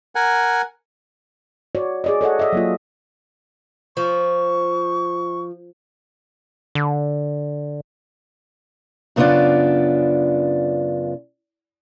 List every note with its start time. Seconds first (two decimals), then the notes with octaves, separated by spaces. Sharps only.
0.15 A#4 F#5 G#5
1.75 F#4 C#5 D5
2.04 G#4 D5 D#5
2.21 A4 C#5 D#5 F#5
2.39 D#5 E5
2.53 F#3 A#3 F4
3.97 F3 C#6
6.75 D3
9.16 F#2 C#3 B3 D4 F4 D5